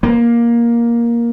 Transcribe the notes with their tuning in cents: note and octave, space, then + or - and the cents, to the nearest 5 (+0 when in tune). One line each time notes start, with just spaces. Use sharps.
A#3 +10